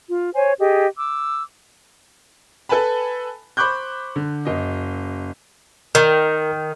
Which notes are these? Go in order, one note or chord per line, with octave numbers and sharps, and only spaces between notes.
F4
C5 C#5 G#5
G4 G#4 D#5
D6 E6
A4 B4 G#5 A5 B5
C5 B5 C#6 D6 F#6 G6
D3
F#1 D#5
D#3 A#4